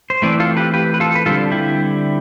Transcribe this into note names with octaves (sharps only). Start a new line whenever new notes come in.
C5
E3 A3 C4 B4 D5
F4 A4
G4 B4
G4 B4
B4
F4 A4
B4
D3 G3 C4 F4 A4
E4 G4